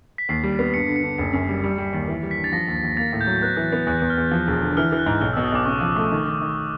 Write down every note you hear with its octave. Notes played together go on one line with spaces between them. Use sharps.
B6
D#2 C7
G3
B3
G2 C#7
D3
C#7
D3
F#1 C#7
F#2
G3
G3
G3
D#2
E3
G3
B6
G2
A6
F3 A#6
D#2
D#2
A#3 A6
A2
G6
F#3
B3 F#6
E3
F#6
B3
E2 F#6
E2
F6
E2
F3
E1
D3
E3 F6
E3
F#6
G#2
B1 F6
E6
B2
D#6
B1 D6
C#3 C#6
F3
D#6
A3
D#3
D#3
D#3